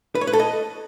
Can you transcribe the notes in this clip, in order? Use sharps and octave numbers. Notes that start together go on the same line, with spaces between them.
B4
C#5
B4
A4
D#5